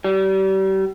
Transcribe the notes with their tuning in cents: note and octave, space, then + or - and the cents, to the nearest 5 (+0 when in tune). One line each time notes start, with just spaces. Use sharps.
G3 -35